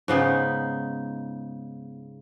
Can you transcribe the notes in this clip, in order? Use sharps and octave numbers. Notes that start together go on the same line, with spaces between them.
G#2 C#3 B3 D#4